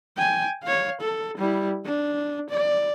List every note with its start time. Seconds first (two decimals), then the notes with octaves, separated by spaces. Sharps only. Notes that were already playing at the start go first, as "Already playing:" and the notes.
0.17 G5 G#5
0.63 C#5 F5
1.01 A4
1.38 G3 E4
1.85 D4
2.50 D5